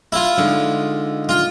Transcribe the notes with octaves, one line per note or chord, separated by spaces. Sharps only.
E4 F4
D3 G#3 D#4
F4